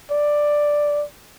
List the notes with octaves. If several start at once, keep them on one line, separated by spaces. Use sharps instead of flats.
D5